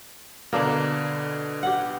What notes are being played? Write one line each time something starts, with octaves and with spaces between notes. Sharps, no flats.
B2 D3 A#3 D4
G4 F#5